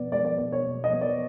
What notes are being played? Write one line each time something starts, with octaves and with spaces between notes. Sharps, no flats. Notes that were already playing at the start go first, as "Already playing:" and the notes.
Already playing: B2 B3 D5
G#3 D5
D5
B2 D5
C#5
B2
D#5
B3
D5